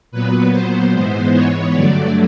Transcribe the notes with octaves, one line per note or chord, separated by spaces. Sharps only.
A#2 F#3 B3 B4
C5
G#2 E3 G#3 B3
C#5
G2 D3 F#3 A3 D5